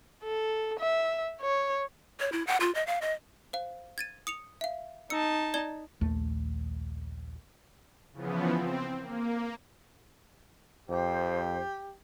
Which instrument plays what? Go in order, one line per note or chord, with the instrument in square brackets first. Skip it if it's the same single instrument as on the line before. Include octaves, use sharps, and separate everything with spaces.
[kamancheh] A4
E5
C#5
[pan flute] C#5
E4
F#5
F4
D#5
F5
D#5
[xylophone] C5 F5
G#6 A6 D#7
D#6 C#7 F7
E5 F5
[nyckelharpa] D#4 A5 [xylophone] E6 C#7
[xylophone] D5 G#6 G7
[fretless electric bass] A#1 D#2 A3
[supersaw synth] C#3 E3 F3 B3
C4
A#3
[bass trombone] F2 [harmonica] G4 [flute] C5